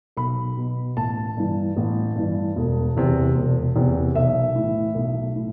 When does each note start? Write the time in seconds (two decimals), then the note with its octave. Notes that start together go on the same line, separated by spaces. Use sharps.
0.17 B1 B5
0.57 B2
0.97 A1 A5
1.37 G2 E3
1.77 A1
2.16 G2 E3
2.56 E1
2.97 E2 C3 E3
3.36 E1
3.75 E2 C3 E3
4.15 B1 E5
4.56 A2 E3
4.95 B1
5.36 A2